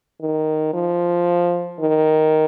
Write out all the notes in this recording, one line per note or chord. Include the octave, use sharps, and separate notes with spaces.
D#3
F3
D#3